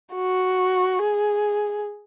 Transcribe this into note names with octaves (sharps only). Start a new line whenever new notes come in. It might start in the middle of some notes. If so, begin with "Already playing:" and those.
F#4
G#4